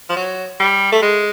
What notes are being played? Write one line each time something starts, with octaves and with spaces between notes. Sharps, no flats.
F3
F#3
G3
A3
G#3